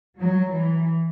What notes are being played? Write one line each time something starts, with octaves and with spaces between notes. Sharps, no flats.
F#3
E3